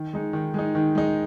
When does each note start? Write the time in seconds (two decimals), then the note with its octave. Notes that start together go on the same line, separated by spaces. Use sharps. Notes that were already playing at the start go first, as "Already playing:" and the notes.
Already playing: D#3
0.13 G#3 D#4
0.33 D#3
0.54 G#3 D#4
0.75 D#3
0.95 G#3 D#4